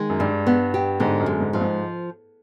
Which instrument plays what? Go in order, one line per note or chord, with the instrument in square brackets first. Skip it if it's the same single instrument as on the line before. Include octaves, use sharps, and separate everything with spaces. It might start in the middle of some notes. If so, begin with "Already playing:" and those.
Already playing: [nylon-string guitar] D#3 G#3
[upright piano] F#2
[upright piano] G2 [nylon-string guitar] G3
[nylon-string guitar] B3
G4
[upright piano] G#2 [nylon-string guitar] D3
[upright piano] F#2
[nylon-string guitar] G#3
[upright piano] G#2
[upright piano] G2 [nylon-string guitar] F3
[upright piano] G#2